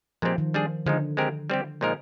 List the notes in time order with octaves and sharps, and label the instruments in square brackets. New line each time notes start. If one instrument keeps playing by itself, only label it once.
[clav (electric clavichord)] A#2 G#3 C4 G4 [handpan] F3
[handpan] D#3
[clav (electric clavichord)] G3 D4 G#4
[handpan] D3 [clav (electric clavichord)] F3 G#3 D#4
[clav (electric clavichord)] G#3 C4 G4 A#4
G3 C4 G4
A#2 F3 G#3 D#4 A#4